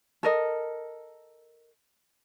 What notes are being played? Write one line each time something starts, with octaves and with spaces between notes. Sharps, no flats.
A4 A#4 D#5